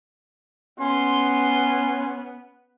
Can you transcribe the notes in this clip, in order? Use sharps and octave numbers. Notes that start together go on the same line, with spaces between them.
B3 C#4 C6